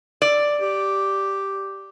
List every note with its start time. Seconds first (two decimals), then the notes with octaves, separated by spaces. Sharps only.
0.22 D5
0.61 G4